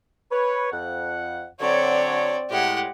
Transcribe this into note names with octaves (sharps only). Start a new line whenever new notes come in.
B4 C#5
F2 F#5
D3 F#3 C4 C#5 D5
A2 G#3 G4 F#5